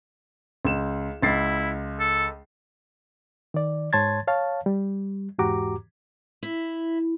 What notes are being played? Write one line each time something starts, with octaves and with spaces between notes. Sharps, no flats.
C#2 E7
C#2 E4 A6 C7
A4
D#3 D5
G#2 C#5 A5 C6 G#6 A6
C#5 F5 A5
G3
E2 G#2 F#4 G4 A#5 D6
E4